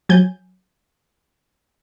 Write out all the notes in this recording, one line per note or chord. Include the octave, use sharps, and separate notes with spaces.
F#3 G#5 G6